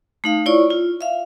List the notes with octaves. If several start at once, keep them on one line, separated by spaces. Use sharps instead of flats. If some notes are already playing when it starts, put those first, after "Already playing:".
A3 D#4 F5
E4 F4 C#5 D5 C#6
F4
E5 F5